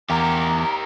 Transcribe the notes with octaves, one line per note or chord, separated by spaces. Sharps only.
E2 G4 A#4 A#5